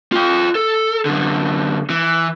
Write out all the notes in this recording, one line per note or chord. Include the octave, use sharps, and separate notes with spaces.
F4 G5
A4
F#2 D3
E3